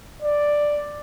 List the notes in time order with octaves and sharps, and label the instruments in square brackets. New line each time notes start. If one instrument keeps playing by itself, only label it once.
[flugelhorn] D5